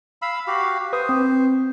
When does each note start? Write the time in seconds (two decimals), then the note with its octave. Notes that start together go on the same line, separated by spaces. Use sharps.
0.22 F5 B5 E6
0.47 F#4 G4 F5
0.93 B4 C5 D#6
1.09 C4